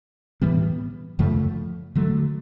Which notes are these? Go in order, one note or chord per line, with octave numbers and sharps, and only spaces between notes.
A2 E3 G3 B3
F#2 C#3 F3 A3
D3 F#3 A3